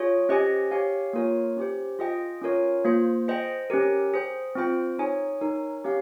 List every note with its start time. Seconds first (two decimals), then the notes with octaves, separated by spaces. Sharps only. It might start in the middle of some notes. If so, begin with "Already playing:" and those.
Already playing: F4 G#4 C#5
0.29 C#4 G4 C5 D#5 G#5
0.71 G4 C#5 F5 G#5
1.13 A#3 F4 A#4 C#5
1.57 C#4 G4 C5
1.99 F4 G#4 D#5 G5
2.42 C#4 F4 A#4 C#5
2.84 A#3 F4 C5
3.28 G#4 C5 D#5 G5
3.70 C#4 G4 A#4
4.14 G#4 C5 G5
4.55 C4 F4 C5 G5
4.99 D#4 G#4 C#5 G#5
5.41 D#4 A#4 C#5 G#5
5.84 C#4 G4 C#5 F5